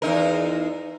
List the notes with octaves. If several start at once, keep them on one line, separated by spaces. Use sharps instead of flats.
E2 D#4 A#4